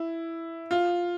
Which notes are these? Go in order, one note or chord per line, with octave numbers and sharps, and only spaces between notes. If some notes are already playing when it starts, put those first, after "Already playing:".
Already playing: E4
F4